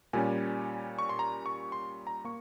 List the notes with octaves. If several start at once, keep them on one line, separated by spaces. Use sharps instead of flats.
A#2 G3 C#4 G#5
C#6
C6
A#5
C#6
C6
A#5
A#3 C#6